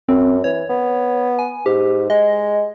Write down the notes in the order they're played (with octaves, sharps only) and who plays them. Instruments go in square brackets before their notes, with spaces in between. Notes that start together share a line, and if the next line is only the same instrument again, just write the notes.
[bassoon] F#2 [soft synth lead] C4
[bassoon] E3 [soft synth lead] C#5
[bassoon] B3
[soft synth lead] G#5
[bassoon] G#2 [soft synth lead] G4
[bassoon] G#3 [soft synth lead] D#5